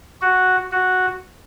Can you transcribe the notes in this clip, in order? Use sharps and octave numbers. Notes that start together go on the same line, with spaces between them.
F#4
F#4